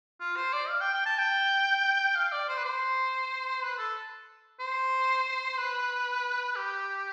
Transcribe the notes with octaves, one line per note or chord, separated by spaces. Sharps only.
F4
C5
D5
F5
G5
G5
A5
G5
F5
D5
C5
B4
C5
B4
A4
C5
B4
G4